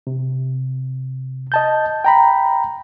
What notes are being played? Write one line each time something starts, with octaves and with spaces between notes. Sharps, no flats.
C3
D#5 A5 G6
G5 A#5 B5